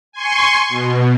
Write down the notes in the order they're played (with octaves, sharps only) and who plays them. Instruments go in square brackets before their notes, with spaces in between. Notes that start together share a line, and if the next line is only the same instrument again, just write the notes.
[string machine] G#5 C6 C#6
B2